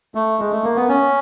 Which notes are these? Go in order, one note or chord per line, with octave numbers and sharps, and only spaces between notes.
A3
G#3
A3
A#3
B3
C#4